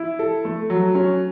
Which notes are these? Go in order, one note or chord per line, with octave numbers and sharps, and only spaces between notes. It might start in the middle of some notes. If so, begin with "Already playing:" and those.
Already playing: E4
A4
A3
F#3
C#4